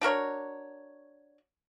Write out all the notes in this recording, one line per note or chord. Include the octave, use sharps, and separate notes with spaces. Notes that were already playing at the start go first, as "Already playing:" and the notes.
D4 F#4 A#4 C#5